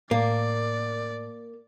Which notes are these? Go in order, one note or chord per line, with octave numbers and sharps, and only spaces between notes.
A2 A#3 D5